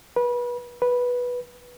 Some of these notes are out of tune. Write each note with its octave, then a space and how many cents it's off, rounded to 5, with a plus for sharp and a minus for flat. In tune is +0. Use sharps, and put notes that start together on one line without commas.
B4 -30
B4 -10